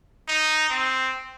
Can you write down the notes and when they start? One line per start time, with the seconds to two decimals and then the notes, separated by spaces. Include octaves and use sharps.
0.28 D#4
0.70 C4